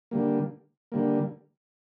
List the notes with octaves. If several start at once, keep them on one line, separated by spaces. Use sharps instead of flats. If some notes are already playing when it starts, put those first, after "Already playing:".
D3 G3 A#3
D3 G3 A#3